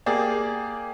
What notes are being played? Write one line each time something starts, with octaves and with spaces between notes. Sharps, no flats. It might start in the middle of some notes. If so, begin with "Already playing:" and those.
A#3 G4 G#4 D5